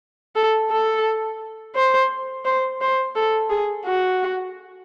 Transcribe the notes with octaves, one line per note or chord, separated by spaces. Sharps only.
A4
A4
C5
C5
C5
A4
G#4
F#4